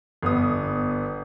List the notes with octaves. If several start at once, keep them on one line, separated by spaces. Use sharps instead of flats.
G1 B3 D#6